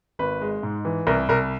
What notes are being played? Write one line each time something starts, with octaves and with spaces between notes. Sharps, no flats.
G#1 B4
G#3
G#2
E3
C2 A#4
C2 A#4